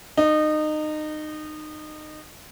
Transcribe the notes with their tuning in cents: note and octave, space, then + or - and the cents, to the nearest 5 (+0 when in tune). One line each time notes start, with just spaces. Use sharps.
D#4 -25